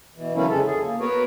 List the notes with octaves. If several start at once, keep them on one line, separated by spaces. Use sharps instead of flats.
B2 E3
D3 E3 F#3 A#3 C#4 E4
F2 C#3 G#3 A4
G#4
A#3
B3 F#4 A#4 B4 C#5